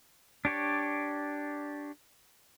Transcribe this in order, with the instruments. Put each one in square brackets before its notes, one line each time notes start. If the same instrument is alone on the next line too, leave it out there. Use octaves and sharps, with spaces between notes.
[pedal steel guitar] D4 G4 C#5 D5